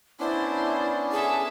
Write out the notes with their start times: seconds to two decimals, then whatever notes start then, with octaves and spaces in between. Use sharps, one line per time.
0.20 B3 C#4 D4 E4 C5 D5 D6
1.12 G#4 A4 E5